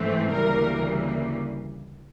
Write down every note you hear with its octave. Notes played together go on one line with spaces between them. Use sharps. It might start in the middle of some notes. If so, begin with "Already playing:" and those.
Already playing: G#2 E3 A3 C4
D2 C#3 E3 G3 A#3 A#4